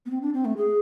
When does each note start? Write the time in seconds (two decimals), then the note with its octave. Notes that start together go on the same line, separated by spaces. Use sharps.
0.06 B3
0.10 C4
0.22 D4
0.34 C4
0.45 A3
0.57 G#4